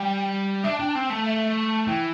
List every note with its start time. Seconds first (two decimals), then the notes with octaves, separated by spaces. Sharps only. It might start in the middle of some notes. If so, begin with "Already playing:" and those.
Already playing: G3 G5
0.64 D4 E5
0.73 A5
0.79 D4 G5
0.88 A5
0.95 C4 G5
1.10 A3 A5
1.26 E5
1.57 A5
1.87 E3 G5